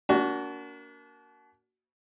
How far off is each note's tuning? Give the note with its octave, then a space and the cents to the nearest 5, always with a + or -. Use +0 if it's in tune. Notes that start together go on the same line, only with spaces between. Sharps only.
A#3 +0 D4 -35 F#4 +10